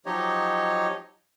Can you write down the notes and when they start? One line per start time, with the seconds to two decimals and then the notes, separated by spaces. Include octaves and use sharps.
0.06 F3 F#3 D#4 G4 C#5 D#5